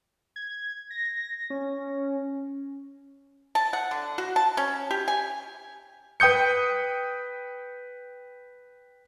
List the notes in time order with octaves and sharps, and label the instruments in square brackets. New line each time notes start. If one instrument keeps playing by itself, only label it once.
[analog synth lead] G#6
A#6
C#4
[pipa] A5
F#5
D3
F#4
A5
C#4
G4
G#5
[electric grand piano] B4 G5 D#6 G6 C#7